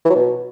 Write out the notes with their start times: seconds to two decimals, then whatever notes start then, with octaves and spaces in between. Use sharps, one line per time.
0.05 E3
0.10 F#3
0.15 B2